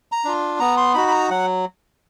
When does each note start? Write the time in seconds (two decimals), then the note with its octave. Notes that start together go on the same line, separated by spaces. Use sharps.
0.12 A#5
0.25 D4 F4
0.59 B3 A#5
0.77 C6
0.94 D#4 F#4 B5
1.07 B5
1.11 A#5
1.30 F#3 F#5